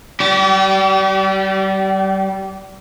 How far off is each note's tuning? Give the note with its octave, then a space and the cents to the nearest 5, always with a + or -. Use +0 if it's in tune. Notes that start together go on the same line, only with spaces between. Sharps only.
G3 -25 G4 -45